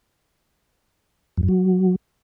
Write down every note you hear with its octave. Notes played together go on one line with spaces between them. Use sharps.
F2
F#2
F#3